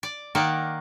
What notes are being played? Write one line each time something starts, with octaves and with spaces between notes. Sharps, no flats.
D5
D#3 A#3 D5 F#5